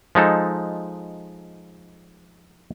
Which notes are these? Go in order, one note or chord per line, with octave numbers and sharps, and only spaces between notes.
F3 G#3 D#4 A4